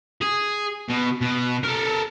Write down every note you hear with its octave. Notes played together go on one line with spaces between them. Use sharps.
G#4
B2
B2
A4 A#4